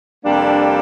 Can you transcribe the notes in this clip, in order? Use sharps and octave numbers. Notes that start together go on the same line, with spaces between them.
F2 C3 G3 A#3 D4